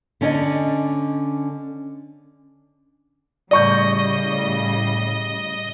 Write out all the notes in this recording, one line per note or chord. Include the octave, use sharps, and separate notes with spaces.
D3 C#4 D5 D#5 G#5
A2 C#3 G3 D5 D#5 C#6 G6